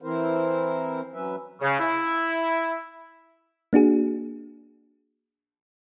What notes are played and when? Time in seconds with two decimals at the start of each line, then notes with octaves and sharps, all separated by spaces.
0.02 E3 C4 E4 A#4 C5
1.14 F#3 C#4 B4 E5
1.62 C#3
1.79 E4
3.73 A#3 D4 F#4 G#4